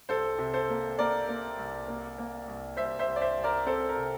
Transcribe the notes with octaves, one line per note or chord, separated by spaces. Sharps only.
C2 A4 C5
C3
A4 C5
A#3
A#3 A#4 D5
A#3
C2
A#3
A#3
C2
C2 C5 E5
C5 E5
C2
D5
C5 E5
C2
A#4 D5
C4 A4 C5
A#4
C3